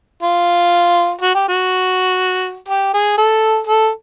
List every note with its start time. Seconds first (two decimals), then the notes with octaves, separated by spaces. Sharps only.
0.23 F4
1.22 F#4
1.35 G4
1.48 F#4
2.68 G4
2.94 G#4
3.18 A4
3.67 A4